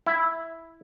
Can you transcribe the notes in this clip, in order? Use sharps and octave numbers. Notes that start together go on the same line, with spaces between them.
E4